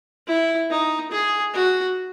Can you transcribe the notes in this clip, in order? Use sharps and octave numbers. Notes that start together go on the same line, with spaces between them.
E4
D#4
G#4
F#4